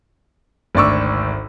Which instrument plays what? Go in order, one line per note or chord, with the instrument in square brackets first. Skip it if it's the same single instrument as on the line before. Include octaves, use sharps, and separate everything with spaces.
[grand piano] G#1 D2 D5 C#6 E6